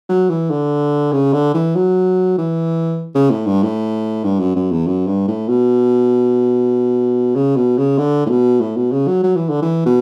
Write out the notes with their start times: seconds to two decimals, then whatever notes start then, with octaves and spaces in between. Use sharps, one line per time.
0.09 F#3
0.30 E3
0.50 D3
1.12 C#3
1.33 D3
1.54 E3
1.75 F#3
2.38 E3
3.15 C#3
3.31 A2
3.46 G2
3.63 A2
4.24 G2
4.39 F#2
4.56 F#2
4.71 E2
4.87 F#2
5.07 G2
5.28 A2
5.49 B2
7.36 C#3
7.56 B2
7.78 C#3
7.98 D3
8.26 A2
8.30 B2
8.60 A2
8.77 B2
8.92 C#3
9.07 F#3
9.23 F#3
9.36 E3
9.49 D3
9.62 E3
9.86 B2